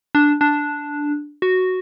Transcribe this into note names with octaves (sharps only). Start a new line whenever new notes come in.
D4
D4
F#4